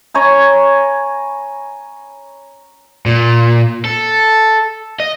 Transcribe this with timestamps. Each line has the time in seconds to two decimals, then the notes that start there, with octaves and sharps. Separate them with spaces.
0.14 C#5 G#5 A#5 B5
3.06 A#2
3.85 A4
5.00 D#5